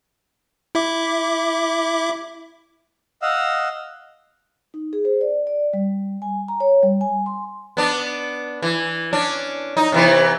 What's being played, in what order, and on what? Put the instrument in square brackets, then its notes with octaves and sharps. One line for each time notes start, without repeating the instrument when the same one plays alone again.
[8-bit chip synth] E4 E5 D6
[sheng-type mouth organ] D#5 F5 F#5 E6
[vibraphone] D#4
G#4
C5
D5
D5
G3
G#5
A#5
C#5
G3
G#5
C6
[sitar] B3 D4
E3
C#4 D4
D#4
C3 E3 B3